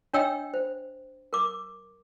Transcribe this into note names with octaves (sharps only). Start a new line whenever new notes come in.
D4 C#5 D#5 G5 E6
C5
A#4 D6